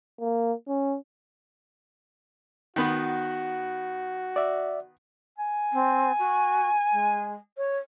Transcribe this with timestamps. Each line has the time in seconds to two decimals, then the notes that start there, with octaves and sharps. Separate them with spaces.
0.21 A#3
0.68 C#4
2.76 D#3 B3 F#4 B5
4.36 D5 E5
5.38 G#5
5.72 C4
6.19 F#4
6.92 G#3
7.57 C#5